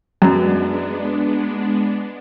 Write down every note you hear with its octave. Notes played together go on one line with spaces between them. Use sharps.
F#2 G#3 B3 D4